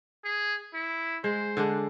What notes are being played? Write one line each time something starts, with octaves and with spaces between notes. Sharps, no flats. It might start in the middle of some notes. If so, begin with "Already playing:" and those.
G#4
E4
G#3 C5
D3 G#3 D4